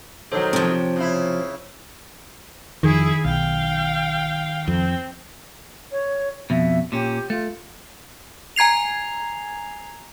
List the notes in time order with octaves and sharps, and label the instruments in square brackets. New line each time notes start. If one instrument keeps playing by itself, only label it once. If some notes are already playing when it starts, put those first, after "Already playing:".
[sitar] B2 D#3 F#3 [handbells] A4 C5 C#5
[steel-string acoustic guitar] C3 F3 [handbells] C4 C#5 G5
[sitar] C#3 E4
[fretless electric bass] F2 [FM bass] D#3 [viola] E4 G#4
[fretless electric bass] B1 [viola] F5 G5
[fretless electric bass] F2 [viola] C4
[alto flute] C#5
[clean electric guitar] F2 B2 [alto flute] E5
[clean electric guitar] A#2 C#4 [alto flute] G4
[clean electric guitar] A3 [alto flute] F4
[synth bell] G#5 A#5 G#6 C7 F7